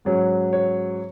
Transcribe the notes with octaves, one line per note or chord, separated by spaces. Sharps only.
G#2 F#3 C#4
C#5